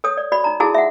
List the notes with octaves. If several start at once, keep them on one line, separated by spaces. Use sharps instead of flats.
A4 C#5 D#6
D5
F#4 D5 B5
D#4 A#5
D#4 E4 F#4 G#4 A4 A5
E5 F#5